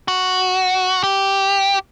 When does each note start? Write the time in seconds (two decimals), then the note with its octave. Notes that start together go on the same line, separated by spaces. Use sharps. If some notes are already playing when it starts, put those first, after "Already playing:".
0.08 F#4
1.03 G4